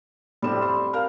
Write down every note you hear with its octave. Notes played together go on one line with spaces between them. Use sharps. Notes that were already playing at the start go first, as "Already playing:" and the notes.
A2 G3 C4 D4 E7
C6
A#4 C5 F5 F6